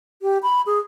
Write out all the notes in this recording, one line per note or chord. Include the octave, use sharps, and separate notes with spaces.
G4
B5
G#4